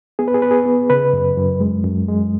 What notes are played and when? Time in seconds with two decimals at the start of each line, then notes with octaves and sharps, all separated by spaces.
0.19 B3 G#4
0.28 B4
0.34 G#4
0.42 B3 B4
0.51 G#4
0.66 B3
0.90 C#3 B4
1.13 F#2
1.37 F#2
1.60 G#3
1.84 F#2
2.09 G#3